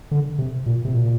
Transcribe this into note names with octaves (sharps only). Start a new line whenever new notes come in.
D3
C3
A#2
C3
A#2